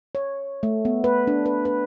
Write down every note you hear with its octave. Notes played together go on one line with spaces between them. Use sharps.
C#5
A3
B3
B4
D4
B4
B4